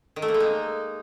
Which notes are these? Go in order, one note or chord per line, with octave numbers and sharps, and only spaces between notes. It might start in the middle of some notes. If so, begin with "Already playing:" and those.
D#3
A3
A#3
G#3
D#4